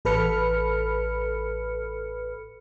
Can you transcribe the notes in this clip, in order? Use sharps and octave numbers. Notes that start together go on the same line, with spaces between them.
A1 A4 B4 B5 F6 C#7